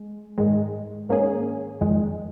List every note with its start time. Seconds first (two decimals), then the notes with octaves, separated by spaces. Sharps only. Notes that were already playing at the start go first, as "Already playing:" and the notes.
Already playing: G#3
0.38 G#2 D#3 G#3
1.09 G#2 D#3 A#3 C#4 G#4
1.81 F2 D#3 G#3